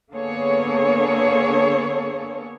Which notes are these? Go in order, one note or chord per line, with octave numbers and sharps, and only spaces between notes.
D3 A#3 B3 G#4 A4 C#5